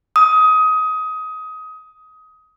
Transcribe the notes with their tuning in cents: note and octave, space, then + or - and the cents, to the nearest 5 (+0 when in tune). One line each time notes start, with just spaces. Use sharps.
D#6 +20